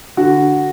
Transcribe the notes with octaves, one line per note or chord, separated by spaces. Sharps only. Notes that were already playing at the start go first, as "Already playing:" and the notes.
D3 F#4